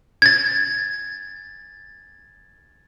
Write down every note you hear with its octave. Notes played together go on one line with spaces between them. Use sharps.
G#6 A6